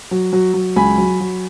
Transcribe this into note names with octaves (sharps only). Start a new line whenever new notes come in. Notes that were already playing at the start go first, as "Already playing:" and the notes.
F#3
F#3
F#3
C#2 G#5 B5
F#3
F#3